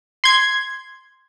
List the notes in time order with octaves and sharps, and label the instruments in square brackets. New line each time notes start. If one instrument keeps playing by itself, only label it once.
[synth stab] C6 G#6